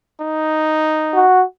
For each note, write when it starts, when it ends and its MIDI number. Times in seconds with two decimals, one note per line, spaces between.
0.21 1.26 63
1.14 1.43 66